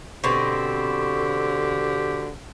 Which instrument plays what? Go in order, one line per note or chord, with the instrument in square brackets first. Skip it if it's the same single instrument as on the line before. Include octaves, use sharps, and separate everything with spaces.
[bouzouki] B2 C4 [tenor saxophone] D3 [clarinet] G4